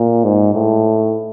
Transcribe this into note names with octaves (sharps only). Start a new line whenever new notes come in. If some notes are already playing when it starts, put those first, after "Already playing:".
Already playing: A#2
G#2
A2